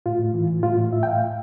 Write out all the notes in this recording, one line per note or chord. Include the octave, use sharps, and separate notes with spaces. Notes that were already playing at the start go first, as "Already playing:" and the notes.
A2 F4
A2
E3
A2
A2 F4
A2
A2 E5
G5
A2 F5